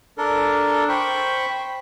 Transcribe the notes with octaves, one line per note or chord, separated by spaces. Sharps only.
D4 A4 A#4
C5 G5 B5 C#6